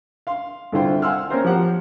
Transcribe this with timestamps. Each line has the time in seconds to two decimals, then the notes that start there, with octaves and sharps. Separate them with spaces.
0.27 F5 C6
0.72 C2 D3 E4 F4 C5 G5
1.02 F5 F#5 G#5 C6 E6 F6
1.30 A#3 C4 C#4 A#4 C5
1.44 F3 F4 G4 F#5 A#5